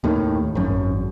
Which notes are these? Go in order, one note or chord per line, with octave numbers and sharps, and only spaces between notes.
D#2 A2 D#3
G#1 F#2